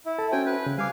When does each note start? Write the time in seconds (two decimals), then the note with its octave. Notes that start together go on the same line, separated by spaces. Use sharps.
0.06 E4
0.19 A4 A5
0.32 C#4 F#4 C5 G5 G#5
0.46 B4
0.66 C#3
0.78 G3 F5 G#5 D6